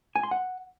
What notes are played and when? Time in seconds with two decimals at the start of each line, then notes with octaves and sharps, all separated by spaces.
0.16 G#5
0.23 C6
0.31 F#5